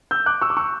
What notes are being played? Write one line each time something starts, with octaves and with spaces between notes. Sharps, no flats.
E6 G6
D6 F#6
C#6 E6
D6
C#6 E6